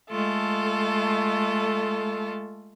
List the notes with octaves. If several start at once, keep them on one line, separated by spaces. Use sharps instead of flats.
G#3 A3 F4 A4